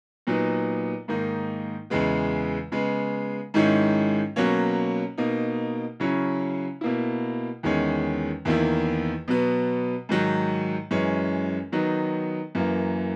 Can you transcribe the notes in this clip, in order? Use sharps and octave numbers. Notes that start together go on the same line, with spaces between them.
A#2 F#3 B3 D#4
G#2 D#3 A#3 D#4
E2 C#3 G#3 B3
C#3 G#3 B3
G#2 D#3 G#3 C#4 E4
B2 F#3 A#3 C#4
B2 A#3 D#4
C#3 F#3 C#4 E4
B2 A#3 E4
E2 D#3 G#3 C#4
E2 D#3 A#3 E4
B2 F#3 B3
G#2 D#3 F#3
F#2 E3 G#3 C#4
D#3 F#3 B3 D#4
F#2 E3 A#3